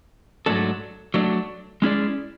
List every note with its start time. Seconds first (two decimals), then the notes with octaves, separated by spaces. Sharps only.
0.46 G#2 F#3 A3 D4 A4
1.14 F#3 A3 D4
1.82 G#3 C#4 E4 G#4 D5